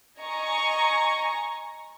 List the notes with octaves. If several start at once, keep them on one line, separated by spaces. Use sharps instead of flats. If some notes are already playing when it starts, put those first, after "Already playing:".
D#5 G#5 A#5 C#6